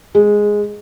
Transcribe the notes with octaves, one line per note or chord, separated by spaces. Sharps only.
G#3